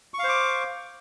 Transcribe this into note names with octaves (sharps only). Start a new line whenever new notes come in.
C5 F5 C#6 D6